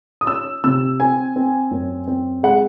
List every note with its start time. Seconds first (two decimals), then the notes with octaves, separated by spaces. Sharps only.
0.21 D#6
0.27 C#4 E6
0.64 C3 E6
1.00 C4 G#5
1.36 C4
1.71 F#2
2.07 C4
2.43 G#3 F#5